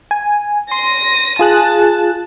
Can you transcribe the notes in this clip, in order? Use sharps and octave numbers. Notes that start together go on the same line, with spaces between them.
G#5
C6 A#6 D#7
F4 G#4 A5 F#6